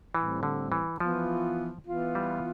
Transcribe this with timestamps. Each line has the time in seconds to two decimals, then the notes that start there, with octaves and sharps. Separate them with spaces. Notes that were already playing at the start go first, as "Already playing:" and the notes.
0.14 A2 E3 G3 C4
0.43 D3
0.72 E3
1.00 E3 F3 B3 F4
1.87 E3 B3 F4
2.15 G3